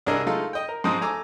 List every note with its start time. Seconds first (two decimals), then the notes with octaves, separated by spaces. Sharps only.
0.06 C2 D4 G#4 A#4 D#5 E5
0.26 G#3 A3 D#4 F4 A4
0.53 D#5 G5
0.69 A#4
0.84 G#2 F3 C4 D#4 D#6
1.01 A3 G#5 A#5 D6 E6